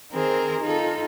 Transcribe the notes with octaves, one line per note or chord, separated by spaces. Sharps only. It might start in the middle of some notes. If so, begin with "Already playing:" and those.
D#3 C4 G#4 A#4 C5
D#4 F4 A4